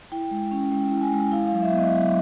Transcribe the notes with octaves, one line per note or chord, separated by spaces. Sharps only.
E4 G5
G#3
C#4
G#3 G5
E4
G#5
G#3
E4 F5
F5
F#3
E5
B3
D#5
F#3